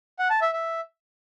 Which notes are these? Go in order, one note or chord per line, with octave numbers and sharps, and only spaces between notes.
F#5
A5
E5
E5